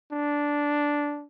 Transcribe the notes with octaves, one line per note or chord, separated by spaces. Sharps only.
D4